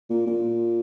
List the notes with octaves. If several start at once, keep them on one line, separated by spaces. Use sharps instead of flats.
A#2
A#2